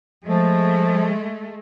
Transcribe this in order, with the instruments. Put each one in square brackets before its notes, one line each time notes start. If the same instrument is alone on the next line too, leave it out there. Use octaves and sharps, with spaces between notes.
[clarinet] F3 [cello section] G#3 A3